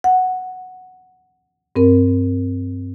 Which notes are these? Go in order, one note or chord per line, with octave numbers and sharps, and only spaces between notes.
F#5
G2 C4 A#4